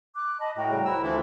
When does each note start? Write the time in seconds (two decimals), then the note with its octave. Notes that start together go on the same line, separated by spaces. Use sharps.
0.15 D6 F#6
0.39 D#5 A5 B5
0.57 A2 F#4 G5 A#5
0.70 C#3 G3
0.85 C2 E4 E6
1.03 D2 E3 F3 A3 D4 E4 F4